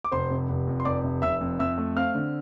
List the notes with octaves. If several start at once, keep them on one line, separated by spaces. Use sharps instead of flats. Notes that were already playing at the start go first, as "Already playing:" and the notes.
D6
F1 C5 C6
C3
F1
F2
C6
F1 D5 D6
C3
F1 E5 E6
F2
F2 E5 E6
A3
C4 F5 F6
D3